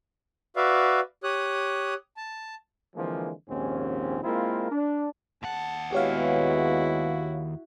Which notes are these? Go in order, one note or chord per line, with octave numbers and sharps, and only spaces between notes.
F#4 B4 D5 E5 F5
G4 C#5 D#6 F#6
A5
D3 E3 F3 G#3 A#3 C4
A#1 D#2 G#2 C4 C#4
G#3 A#3 C4 E4 F4 A#4
D4
D#2 F#5 A5
G#3 B3 E4 F#4 G4 C#5 F5